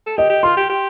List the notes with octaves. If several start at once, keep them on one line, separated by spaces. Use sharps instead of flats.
A4
G4 D#5
G4
F4 C6
G4
G4